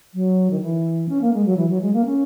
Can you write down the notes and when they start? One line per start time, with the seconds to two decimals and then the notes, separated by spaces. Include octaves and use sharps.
0.14 F#3
0.51 D#3
0.61 E3
1.09 C#4
1.22 A#3
1.34 G#3
1.46 F#3
1.57 E3
1.70 F#3
1.81 G#3
1.94 A#3
2.05 C#4